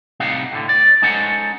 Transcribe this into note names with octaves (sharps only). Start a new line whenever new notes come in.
A2 C3 G3 D#4 F5 F#5
A2 D3
D5
G#3 C#4 D#4 A4 C5 F#5